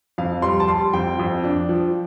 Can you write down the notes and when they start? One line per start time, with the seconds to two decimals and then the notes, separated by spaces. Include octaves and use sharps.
0.18 F2 F5
0.42 G3 C6
0.60 A5
0.68 G3 C6
0.93 F2 G5
1.19 F2
1.44 D4
1.69 F3